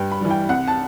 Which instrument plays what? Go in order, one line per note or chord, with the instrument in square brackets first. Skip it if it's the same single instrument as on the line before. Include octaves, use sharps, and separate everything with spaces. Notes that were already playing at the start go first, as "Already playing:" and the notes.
Already playing: [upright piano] G2 G5
B5
E3 G3
G5
C2 F#5
A5